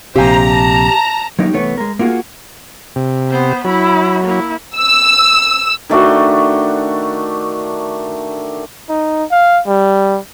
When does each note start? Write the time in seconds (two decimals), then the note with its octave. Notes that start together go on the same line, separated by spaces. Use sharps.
0.16 A#1 C3 G4 C5 F5 G#5 A#5
0.49 A5
1.39 F#3 A#3 D#4 G4
1.53 C2 E3 A3 B3 C#5
1.78 G#3 A#4
1.99 A#3 F4 F#4 G#4
2.96 C3
3.29 B3 C5
3.64 F#3 E4 B5
4.24 A#3 E4
4.75 E6
5.90 D#3 A3 D4 F#4
8.89 D#4
9.31 F5
9.67 G3